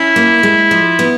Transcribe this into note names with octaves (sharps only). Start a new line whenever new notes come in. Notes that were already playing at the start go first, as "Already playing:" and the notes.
Already playing: C#4 E4
A#3
G#3
F3
B3